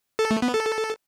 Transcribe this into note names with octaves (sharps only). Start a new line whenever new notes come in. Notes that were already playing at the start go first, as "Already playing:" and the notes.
A4
A3
B3
A4